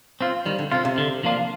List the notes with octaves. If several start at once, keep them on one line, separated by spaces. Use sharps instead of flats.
C4 F4
D#3 G3
D3
C3 C4 F4
C3
D3
F3 A#3 D4 F4